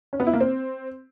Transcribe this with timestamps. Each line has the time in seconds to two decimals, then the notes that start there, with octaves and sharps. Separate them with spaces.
0.13 C#4
0.20 B3
0.27 E4
0.34 A#3
0.41 C4